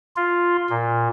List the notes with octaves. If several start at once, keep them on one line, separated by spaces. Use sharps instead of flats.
F4
A#2